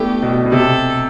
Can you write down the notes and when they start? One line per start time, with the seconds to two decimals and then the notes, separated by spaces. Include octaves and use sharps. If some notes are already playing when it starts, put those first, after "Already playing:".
Already playing: A3 B3 D4 E4 G4
0.22 B2
0.45 B2
0.52 C3 A4